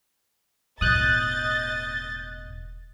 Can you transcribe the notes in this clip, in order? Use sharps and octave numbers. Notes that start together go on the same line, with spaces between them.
E1 A2 D#5 D#6 F#6 G6 A6